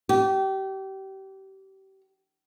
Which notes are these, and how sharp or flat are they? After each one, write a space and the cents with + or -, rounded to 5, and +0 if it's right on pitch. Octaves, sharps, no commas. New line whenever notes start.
G4 -30